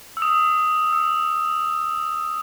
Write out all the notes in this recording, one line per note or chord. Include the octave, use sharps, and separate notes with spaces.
E6
D#6
E6